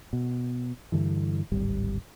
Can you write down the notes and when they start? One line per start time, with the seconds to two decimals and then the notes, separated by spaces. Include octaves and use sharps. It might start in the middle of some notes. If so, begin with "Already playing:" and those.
0.13 B2
0.92 G2 D3 E3
1.52 D1 G#1 G3